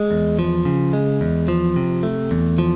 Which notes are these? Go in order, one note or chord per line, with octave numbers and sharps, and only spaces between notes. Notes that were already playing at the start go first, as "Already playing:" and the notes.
Already playing: G#3
E2
F3
C#3
G#3
E2
F3
C3
A3
E2
F3